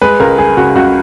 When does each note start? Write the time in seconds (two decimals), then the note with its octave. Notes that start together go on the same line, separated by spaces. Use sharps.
0.01 G#3 B4
0.20 C#2 A#4
0.38 G#3 G#4
0.57 C#3 F#4
0.75 C#2 F#4